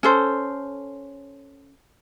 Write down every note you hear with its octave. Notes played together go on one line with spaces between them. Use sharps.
C#4 A4 C5